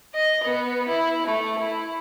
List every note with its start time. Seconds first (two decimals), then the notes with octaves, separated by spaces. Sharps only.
0.14 D#5
0.44 B3
0.88 E4
1.26 A3
1.58 E4